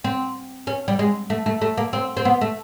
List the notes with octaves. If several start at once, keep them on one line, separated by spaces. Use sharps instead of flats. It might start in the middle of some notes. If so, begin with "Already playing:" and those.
C4
C#4
G3
G#3
A3
A3
A3
A#3
C4
C4
B3
A3